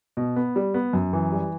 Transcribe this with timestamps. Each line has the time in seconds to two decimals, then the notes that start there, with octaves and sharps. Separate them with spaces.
0.17 B2
0.36 B3
0.56 G3
0.74 B3
0.93 F#2
1.13 E3
1.32 G3